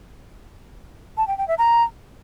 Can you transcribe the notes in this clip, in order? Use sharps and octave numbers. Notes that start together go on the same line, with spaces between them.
A5
G5
G5
E5
A#5